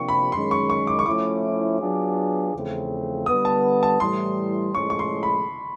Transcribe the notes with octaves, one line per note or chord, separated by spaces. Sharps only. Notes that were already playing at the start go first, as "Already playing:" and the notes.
Already playing: C3 F3 A#3 D4 G4 C#6
B5
F#2 D#3 G#3 C#4 C6
C#6
C#6
D6
C#6
F3 A3 C#4 E4 D6
F#3 B3 D4 F4 G#4
E2 C#3 F3 A3 C4
D3 G3 B3 D#6
A5
A5
A2 E3 G3 C6
A2 F3 G#3 C#4 C#6
C#6
C6
B5